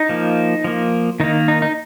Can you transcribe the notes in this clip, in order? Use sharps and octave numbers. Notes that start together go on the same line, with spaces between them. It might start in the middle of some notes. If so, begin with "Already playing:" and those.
Already playing: D#4
F3 A#3
F3 A#3
D#3 A#3 D#4
D#4
D#4